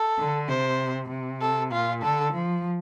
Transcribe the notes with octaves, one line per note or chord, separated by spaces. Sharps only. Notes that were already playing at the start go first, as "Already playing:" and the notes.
Already playing: A4
D3
C3 C5
C3
A4
A#2 F4
D3 A4
F3